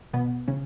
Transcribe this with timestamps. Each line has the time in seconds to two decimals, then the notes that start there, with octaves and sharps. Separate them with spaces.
0.13 B2 B3
0.48 C#3 C#4